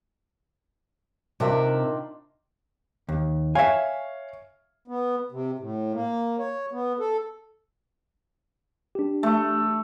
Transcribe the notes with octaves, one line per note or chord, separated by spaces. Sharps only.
C3 D#3 D4 F4 A#4 E5
D#2
C#5 E5 F5 G#5
B3
C3
A2
A#3
C#5
B3
A4
D4 G4
A3